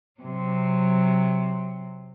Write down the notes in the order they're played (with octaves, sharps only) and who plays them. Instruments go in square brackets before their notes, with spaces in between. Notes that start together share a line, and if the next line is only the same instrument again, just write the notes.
[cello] C3 F#3